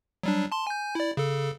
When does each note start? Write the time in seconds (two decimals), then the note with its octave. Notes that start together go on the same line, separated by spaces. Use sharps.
0.23 F#3 G3 D4
0.52 A5 C6
0.67 G#5 G6
0.95 E4 D5
1.17 C#3 A4